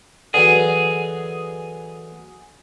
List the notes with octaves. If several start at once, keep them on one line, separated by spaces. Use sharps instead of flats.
D3 E3 F#3 G#4